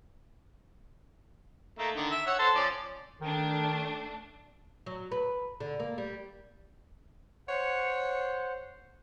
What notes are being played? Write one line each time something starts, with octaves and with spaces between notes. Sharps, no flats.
A3 A#3 D#4
D3 D#3
E5
C#5 F#5 E6
A4 C5
F3 C#4 D5
D#3 A3 D4
F#3
B4
D3
A#3
G3
C5 C#5 F#5